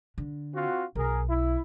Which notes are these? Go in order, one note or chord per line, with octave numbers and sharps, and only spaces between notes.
D3
C4 F4 F#4
B1 G#4 A#4
E4